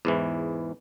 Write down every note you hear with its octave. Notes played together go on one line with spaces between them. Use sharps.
E2 G#2 E3